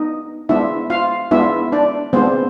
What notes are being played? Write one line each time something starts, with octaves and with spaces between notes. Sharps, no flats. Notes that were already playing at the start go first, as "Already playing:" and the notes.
Already playing: B3 D4 D#4 D#5
G#3 B3 D4 E4 F4 E5
F4 F5
G#3 B3 D4 E4 F4 E5
D4 D5
G#3 B3 C4 D4 F4 C5